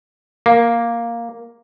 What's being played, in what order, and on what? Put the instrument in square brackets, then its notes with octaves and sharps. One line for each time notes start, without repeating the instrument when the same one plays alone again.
[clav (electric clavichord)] A#3